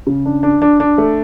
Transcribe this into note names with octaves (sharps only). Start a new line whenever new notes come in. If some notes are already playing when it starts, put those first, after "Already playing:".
C#3
D4
D4
D4
D4
A3